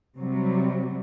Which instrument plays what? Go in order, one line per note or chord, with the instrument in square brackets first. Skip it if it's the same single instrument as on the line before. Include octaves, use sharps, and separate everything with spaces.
[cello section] C3 F#3 G3